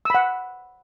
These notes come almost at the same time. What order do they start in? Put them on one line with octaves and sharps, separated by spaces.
E6 B5 F#5